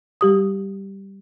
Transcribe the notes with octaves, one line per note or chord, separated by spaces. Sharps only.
G3 G4 D#6